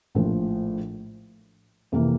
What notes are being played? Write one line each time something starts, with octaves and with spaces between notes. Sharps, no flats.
A#1 A2 F3
F2 C3 E3 A#3